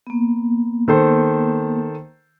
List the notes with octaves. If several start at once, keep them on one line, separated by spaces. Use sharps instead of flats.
A#3 B3
D#3 A4 C5